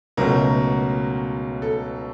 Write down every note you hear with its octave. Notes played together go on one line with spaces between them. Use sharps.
C#2 B2 F#3 A3 A#4
A4